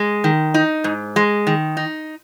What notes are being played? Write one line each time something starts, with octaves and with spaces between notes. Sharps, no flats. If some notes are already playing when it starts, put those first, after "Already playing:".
Already playing: G#3
D#3
D#4
G#2
G#3
D#3
D#4